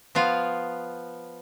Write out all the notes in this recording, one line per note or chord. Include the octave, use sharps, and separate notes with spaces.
F3 B3 F4